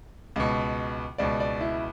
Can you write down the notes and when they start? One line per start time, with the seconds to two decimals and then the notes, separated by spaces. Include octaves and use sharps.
0.36 C#2 B2
1.18 C#2 B2 D5
1.40 D5
1.61 E4